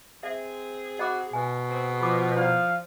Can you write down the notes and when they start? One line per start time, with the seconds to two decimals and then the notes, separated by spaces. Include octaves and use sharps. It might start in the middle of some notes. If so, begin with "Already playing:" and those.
0.23 C4 G#4 E5
0.99 F#4 D#5 B5 D6
1.33 B2 G#5
1.70 C4 G#4
2.01 F3 B5 D6
2.36 E4 C5 D5 F5